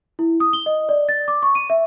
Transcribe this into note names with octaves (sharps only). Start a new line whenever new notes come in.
E4
D#6
G7
D#5
D5
A6
D6
C#6
D#7
E5